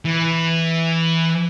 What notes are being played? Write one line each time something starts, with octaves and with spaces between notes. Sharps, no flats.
E3